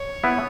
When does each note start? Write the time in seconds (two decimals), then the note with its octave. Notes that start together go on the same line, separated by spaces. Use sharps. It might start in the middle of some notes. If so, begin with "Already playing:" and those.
Already playing: C#5
0.24 B3 E4 B4